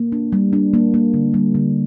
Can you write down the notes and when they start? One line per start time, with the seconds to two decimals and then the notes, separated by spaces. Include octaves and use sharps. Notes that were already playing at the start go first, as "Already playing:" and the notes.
Already playing: A#3
0.12 D4
0.33 G3
0.53 D4
0.74 A#3
0.94 A#3
1.14 D3
1.34 G3
1.55 D3